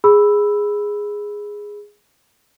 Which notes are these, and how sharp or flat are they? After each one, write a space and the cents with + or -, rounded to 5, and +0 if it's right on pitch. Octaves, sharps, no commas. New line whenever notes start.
G#4 -5 B5 +0 E6 +0